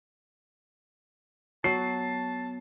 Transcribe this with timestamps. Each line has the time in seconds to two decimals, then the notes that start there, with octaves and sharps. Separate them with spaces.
1.64 F#3 B3 A5 C7